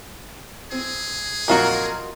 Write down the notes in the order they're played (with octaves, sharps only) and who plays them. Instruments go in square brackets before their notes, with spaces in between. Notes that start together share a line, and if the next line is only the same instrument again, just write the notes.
[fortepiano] C4 [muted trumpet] G#4
[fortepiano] F2 A#2 F#3 [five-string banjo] D#4 F4 F#4 [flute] A#4